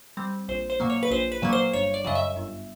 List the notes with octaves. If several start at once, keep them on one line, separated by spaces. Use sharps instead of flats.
G3 C4
A#1 C5
C5
A#2 F#3 A#3
C#5
B4
A#1 C5
B4
A#2 F#3 A#3
C5
G1 C#5
D5
F#2 C#3 F#3 D#5
E5
G1